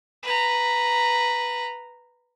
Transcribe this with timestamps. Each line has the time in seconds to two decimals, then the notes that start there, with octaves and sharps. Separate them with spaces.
0.23 B4 A#5